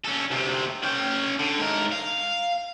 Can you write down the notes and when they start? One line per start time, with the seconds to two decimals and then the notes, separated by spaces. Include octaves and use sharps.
0.04 C#4 A4
0.31 D2 C3
0.83 C#4 G5
1.39 D3
1.59 G#2 A#4
1.92 F5